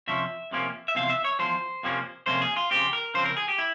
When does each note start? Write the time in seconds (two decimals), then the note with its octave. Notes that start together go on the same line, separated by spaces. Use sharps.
0.08 F2 C3 F3 C#4 E5
0.51 F2 C3 F3 A#3 C#4
0.88 E5
0.95 E2 C3 F3 F5
1.10 E5
1.24 C#5
1.39 E2 C3 F3 C5
1.83 F2 C3 F3 A#3 C#4
2.26 F2 C3 F3 A#3 C#4 C5
2.42 G#4
2.56 F4
2.71 C#3 F3 C4 G4
2.93 A#4
3.14 C#3 F3 C4 C5
3.25 A#4
3.37 G#4
3.48 G4
3.58 E4